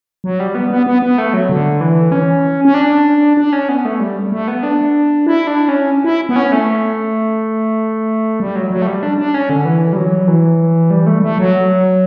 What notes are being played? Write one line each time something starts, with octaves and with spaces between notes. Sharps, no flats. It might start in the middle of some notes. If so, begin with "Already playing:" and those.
F#3
G3
B3
B3
B3
B3
A3
F#3
D3
E3
C#4
C#4
D4
D4
C#4
B3
A3
G3
A3
B3
D4
E4
D4
C#4
E4
B3
C#4
A3
G3
F#3
F#3
A3
G3
D4
D4
C#4
D3
E3
G3
F#3
E3
G3
A3
A3
F#3